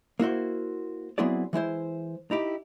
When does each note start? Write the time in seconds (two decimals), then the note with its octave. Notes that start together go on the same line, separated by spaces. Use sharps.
0.20 A#3 E4 F#4 C5
1.18 F#3 B3 C4 E4 G#4 D5
1.53 E3 G#3 E4 C5
2.31 D#4 E4 G4